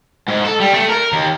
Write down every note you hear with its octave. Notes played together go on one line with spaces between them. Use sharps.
G#2
A4
G3
A3
A#4
D#2